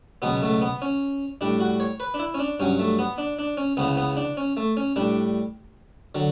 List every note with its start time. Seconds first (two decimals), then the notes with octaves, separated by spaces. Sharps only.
0.22 C#2 B2 F#3 B3
0.42 A3
0.61 B3
0.82 C#4
1.41 A2 G3 D4
1.61 F#4
1.80 C#5
2.00 B4
2.14 D4
2.19 E4
2.34 C#4
2.39 D4
2.60 G2 F#3 C#4
2.79 A3
2.99 B3
3.18 D4
3.39 D4
3.57 C#4
3.77 C#2 C#3 E3 B3
3.97 B3
4.16 D4
4.37 C#4
4.57 A3
4.77 C#4
4.96 A2 G3 D4
6.15 D3 F#3